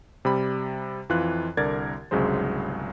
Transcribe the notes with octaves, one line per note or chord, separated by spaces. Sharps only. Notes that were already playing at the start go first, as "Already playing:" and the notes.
C3 G3 B5
F2 E3 F4 F#6
C2 D3 A#4 D5 G#6 A6
G1 C2 C#3 F#3 G#3 C5